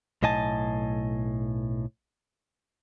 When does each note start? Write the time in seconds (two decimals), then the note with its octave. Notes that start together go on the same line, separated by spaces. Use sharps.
0.22 B1 A2 D#5 G#5 A5